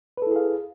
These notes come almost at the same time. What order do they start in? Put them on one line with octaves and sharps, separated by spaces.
B4 A4 E4 G#4 F5